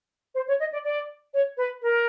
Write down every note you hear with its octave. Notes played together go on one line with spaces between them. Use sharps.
C5
C#5
D#5
D5
D5
C#5
B4
A#4